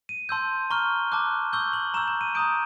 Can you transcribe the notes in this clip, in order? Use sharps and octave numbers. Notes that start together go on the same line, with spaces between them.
D#7
A5 C6 E6 G6
A#5 C#6 F6 G7
A5 D6 F#6
C#6 E6 G6 G7
F#7
A#5 C#6 E6 G6 E7
E7
D#7
A#5 D#6 G6 D7